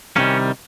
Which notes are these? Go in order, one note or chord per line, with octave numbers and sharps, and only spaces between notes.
C2 C3 D#3 G3 A#3 C#4